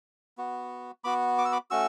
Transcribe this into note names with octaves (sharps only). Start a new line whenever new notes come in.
B3 F#4
B3 F#4 B5 D6
D6
E6
B5 D6
A3 C#4 F#4 C#6 E6